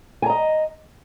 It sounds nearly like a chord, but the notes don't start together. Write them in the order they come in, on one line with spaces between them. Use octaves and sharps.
G#5 A#5 D#5